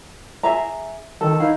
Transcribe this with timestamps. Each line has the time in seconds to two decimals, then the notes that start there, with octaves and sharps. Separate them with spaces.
0.43 G#4 E5 A#5
1.21 D#3 A4
1.40 D#4 E4 F5